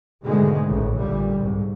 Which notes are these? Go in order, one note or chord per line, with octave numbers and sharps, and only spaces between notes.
G#2 B2 D3 D#3 G#3 A3
A1 A2 C#3
A1 A#2 D3 G3
C2 G#2